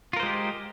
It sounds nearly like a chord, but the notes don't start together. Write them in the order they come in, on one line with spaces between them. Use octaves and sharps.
F4 A#4 C5 G#3 G4